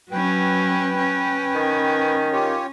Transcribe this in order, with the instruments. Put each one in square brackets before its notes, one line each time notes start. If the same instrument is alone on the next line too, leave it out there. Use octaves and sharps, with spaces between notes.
[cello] F#3 C#4 [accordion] B4 G5
[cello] C#4
[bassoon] D#3
[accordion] F4 G4 C#5